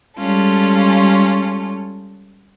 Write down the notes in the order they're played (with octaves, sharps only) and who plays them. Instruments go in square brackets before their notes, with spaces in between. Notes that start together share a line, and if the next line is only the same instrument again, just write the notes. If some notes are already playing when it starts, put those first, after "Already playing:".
[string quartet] G3 G#3 C#4 F4 A4